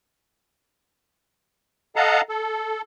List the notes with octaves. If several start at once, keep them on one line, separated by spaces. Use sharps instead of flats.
A4 D#5 F5 F#5 A5 A#5
A4